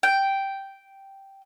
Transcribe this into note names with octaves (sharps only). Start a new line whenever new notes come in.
G5